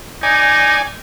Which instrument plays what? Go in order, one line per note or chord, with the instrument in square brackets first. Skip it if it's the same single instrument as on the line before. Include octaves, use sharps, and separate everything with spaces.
[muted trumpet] D#4 [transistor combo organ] D5 G#5